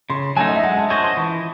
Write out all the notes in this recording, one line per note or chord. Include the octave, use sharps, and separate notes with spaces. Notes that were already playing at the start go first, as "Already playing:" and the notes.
C#3 C6
F#3 A3 D#4 G#5
D#5
E5
G#3 F#5
A5
C#4 G#4 C5 D#5 C#6
C6
E3 C#6